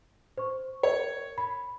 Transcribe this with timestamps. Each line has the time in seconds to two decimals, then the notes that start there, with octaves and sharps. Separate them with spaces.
0.38 C5 C#6
0.83 A#4 C#5
1.38 B5